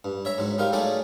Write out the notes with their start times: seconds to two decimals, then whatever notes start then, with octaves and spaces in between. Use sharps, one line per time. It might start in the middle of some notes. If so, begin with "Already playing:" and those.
0.04 G2
0.25 C#5 E5 A#5
0.38 G#2 F#3
0.58 G3 D#4 F4 A#4
0.73 F#3 A3 D#4 F4 G#4 D5